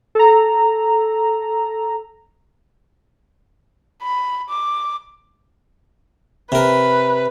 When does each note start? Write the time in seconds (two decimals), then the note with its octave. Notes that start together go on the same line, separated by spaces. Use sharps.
0.15 A4 A#5
4.02 B5
4.49 D6
6.52 C3 A#4 B4